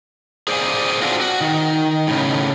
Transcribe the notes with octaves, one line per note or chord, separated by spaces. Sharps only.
G#4 C5 D5 E5 F5 G#5
C4 D4 F4 F#4
F#4
D#3
A2 C#3